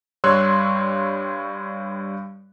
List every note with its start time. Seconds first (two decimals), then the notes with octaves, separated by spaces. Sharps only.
0.24 G2 G3 C#5 C6 E6 F#6